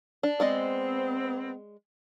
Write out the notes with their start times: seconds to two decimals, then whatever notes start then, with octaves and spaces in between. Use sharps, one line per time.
0.23 D4
0.40 G#3 B3 C4 D5 D#5